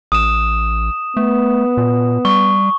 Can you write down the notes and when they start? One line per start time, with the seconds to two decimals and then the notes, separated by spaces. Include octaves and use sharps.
0.12 A1 D#6 E7
1.17 A3 B3
1.77 A#2
2.25 G3 C#6